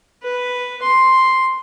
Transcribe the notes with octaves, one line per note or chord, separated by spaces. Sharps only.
B4
C6